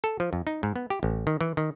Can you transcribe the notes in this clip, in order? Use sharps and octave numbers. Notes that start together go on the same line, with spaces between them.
A4
F3
F2
D#4
G#2
B3
G4
A1
D#3
E3
D#3